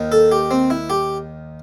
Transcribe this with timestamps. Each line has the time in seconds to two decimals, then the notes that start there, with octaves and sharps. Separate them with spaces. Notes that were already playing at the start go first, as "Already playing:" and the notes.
Already playing: D#2 D#3
0.12 A4
0.32 G4
0.51 C4
0.70 E4
0.90 G4